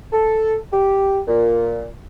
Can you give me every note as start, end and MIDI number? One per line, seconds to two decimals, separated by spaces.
0.13 0.56 69
0.72 1.21 67
1.28 1.85 46